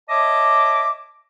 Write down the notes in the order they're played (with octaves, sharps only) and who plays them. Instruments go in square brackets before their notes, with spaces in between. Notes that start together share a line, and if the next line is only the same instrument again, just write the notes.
[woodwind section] C#5 D#5 E5 A5 D6